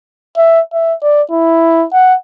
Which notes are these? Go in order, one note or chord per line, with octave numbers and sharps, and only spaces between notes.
E5
E5
D5
E4
F#5